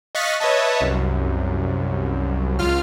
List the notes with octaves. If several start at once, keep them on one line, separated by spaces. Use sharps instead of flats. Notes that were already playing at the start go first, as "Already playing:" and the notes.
D#5 F5 C#6 F#6 A6 B6
B4 C#5 D#5 E5 A5
C2 F#2
C#2 F4 F6